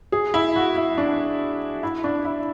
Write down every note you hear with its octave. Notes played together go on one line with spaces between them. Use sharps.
G#4
E4
F#4
E4
D4
E4
D4
E4